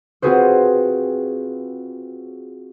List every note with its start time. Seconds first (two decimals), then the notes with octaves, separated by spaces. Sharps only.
0.22 C4 F4 F#4 G#4 B4 C5